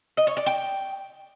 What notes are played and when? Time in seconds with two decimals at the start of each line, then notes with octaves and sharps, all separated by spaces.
0.17 D#5
0.27 C#5
0.37 D5
0.46 G5